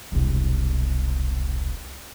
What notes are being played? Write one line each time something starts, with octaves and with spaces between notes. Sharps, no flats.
E1 C2